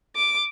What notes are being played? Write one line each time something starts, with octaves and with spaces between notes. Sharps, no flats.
D6